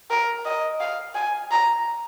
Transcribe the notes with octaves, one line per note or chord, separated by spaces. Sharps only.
A#4
D#5
F5
G#5
A#5